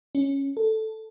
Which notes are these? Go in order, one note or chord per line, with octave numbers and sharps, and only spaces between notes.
C#4
A4